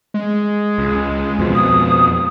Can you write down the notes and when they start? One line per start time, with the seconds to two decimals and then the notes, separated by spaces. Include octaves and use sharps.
0.14 G#3
0.78 C#2
1.39 F2 B2 F3
1.55 D#6